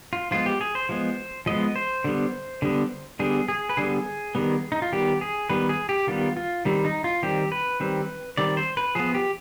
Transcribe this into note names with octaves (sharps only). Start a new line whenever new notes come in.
F4
F3 G#3 B3 F4
G4
G#4
C5
F3 G#3 B3
F3 G#3 B3 D#5
C5
D3 G3 B3
D3 G3 B3
D3 G3 B3 G#4
G#4
B4
D3 G3 B3 G#4
D#3 G3 B3
D#4
F4
D#3 G3 B3 G4
G#4
D#3 G3 B3 B4
G#4
G4
D#3 G3 B3 F4
F4
D#3 G3 C4
D#4
F4
D#3 G3 C4 G4
B4
D#3 G3 C4
D#3 G3 C4 D5
C5
B4
F3 B3 G#4
G4